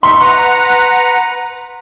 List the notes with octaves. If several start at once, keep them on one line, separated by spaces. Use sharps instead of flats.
D#4 E5 C6 C#6
B4 F#5 A#5